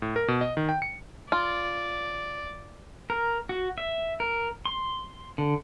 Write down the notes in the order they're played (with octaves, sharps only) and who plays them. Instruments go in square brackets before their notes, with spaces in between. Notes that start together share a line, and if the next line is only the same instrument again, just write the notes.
[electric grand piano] A2
A#4
B2
D#5
D#3
G5
C#7
[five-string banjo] F4 [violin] D5
[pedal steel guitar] A#4
F#4
E5
A#4
C6
D3